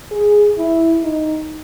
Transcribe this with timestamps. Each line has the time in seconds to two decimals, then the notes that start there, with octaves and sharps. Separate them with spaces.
0.11 G#4
0.58 E4
1.03 D#4